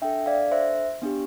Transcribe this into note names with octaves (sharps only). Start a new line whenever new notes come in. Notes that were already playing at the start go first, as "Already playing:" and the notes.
D4 A4 E5 G5
D5 F5
C5 E5
B3 D4 G4